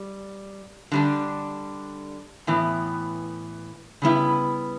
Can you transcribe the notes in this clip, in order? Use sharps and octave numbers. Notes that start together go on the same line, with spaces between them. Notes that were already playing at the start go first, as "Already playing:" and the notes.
Already playing: G3
D3 G3 D4
A2 E3 B3
C#3 G3 B3 E4